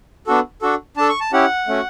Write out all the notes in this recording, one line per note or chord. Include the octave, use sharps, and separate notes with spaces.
B3 D4 F#4 A4
D4 F#4 A4
D4 A4 A5
C#6
A5
C#4 E4 G4 F#5
A3 C#4 F#4